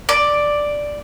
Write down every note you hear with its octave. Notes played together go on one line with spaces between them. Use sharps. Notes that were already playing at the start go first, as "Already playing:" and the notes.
D5